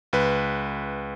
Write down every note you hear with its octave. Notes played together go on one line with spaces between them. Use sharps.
C#2 B4